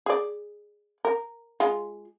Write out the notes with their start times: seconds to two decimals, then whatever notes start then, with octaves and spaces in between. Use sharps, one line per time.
0.06 G#4 D5
1.05 A#4
1.60 G#3 F4